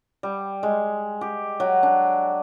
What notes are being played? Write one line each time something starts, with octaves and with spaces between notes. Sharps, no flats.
G3
G#3
G4
F#3
D4